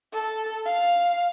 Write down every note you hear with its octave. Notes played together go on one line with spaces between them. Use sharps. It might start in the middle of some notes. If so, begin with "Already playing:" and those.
A4
F5